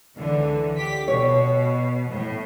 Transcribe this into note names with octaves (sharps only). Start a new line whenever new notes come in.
C#2 D3 E3
G4 B6
B2 C#5
A2